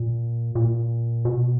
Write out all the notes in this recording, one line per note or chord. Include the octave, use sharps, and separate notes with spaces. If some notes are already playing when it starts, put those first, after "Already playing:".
Already playing: A#2
A#2
B2